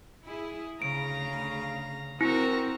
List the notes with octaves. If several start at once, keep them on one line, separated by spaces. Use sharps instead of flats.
E4 G#4
D2 C#3 F5 A#5 D7
C4 E4 F#4 A#4 A#5